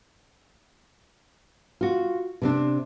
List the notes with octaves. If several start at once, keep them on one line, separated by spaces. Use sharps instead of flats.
F4 F#4
C3 C4 D4